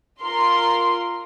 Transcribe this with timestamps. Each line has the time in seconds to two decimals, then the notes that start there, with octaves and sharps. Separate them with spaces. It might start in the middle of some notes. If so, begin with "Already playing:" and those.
0.24 F4 A#4 C6